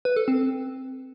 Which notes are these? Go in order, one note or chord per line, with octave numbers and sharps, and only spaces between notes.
B4
A4
C4